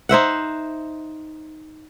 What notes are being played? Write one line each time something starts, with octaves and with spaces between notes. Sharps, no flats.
D#4 C5 E5 F#5